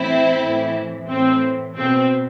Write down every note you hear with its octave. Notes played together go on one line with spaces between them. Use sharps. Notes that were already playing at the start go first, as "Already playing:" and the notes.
Already playing: A2 E3 C4 E4
A2 E3
A2 E3 C4
B2 C4